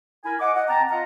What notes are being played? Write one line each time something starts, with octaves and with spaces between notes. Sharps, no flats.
E4 A#4 G#5
D#5 F#5 D6
D#5 F#5
C4 G5 A5 A#5
F4 D#5 F5 F#5 A#5